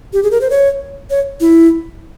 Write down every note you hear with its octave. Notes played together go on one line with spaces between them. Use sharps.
G4
G#4
A#4
C5
C#5
C#5
E4